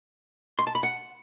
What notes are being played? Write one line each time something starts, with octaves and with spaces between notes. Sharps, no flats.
C6
A5
B5
F#5